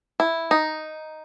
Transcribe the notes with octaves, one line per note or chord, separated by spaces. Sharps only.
E4
D#4